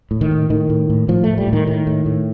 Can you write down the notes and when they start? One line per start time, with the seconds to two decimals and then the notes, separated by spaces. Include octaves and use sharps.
0.11 A2
0.21 D#3
0.31 A2
0.50 A2 D#3
0.70 A2
0.90 A2
1.08 A2 F3
1.24 A2 A3
1.38 G3
1.47 A2
1.53 D#3
1.67 A2 D#3
1.87 A2
2.06 A2